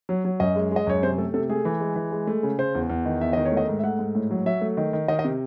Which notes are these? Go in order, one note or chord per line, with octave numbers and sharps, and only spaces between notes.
F#3
F#3
F#2 D#5
G#3
G#3 D#5
F#2 C#5
C3 C5
A3 A4
C3 A4
A3 G#4
E3
G#3
E3
G#3
A3
C#3
C#3 C5
E2
E2
D#3
E2 E5
D#3 D#5
C#5
A3
D#5
G#2
E5
A3 F#5
G#2
A2
F#3
F#3 E5
A3
D#3
D#3
D#3 D#5
D#5
C3